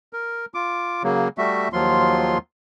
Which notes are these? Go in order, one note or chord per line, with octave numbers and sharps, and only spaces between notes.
A#4
F4 D6
C#3 F#3 A#3
G3 A3 F#4 E5
D#2 F3 F#3 F4 C6